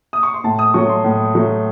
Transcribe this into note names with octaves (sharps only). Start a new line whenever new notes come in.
D#6
C#6
C6
A2 A5
D#6
F#3 A3 C#6
C6
A2
F#3 A3